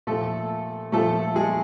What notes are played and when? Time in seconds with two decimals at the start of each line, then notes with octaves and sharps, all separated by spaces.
0.07 A#2 F3 A3 A4
0.92 A#2 F3 A3 A4
1.35 G#3 G#4